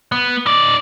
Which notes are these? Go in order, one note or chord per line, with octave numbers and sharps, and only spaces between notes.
B3
D#4 D5